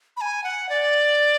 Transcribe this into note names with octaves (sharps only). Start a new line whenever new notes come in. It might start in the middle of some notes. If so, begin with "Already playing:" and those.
B5
G#5
F#5
D5